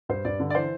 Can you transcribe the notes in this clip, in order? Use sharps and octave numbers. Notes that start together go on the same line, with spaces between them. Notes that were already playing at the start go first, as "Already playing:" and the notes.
G2 C5
G2 D5
D3
D5
E3 C5